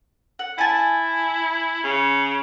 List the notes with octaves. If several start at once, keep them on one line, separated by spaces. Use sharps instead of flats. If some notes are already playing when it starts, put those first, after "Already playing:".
F#5
E4 G#5 A5
C#3